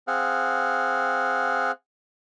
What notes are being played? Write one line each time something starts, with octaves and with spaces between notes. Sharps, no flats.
C4 G#4 F5 F#5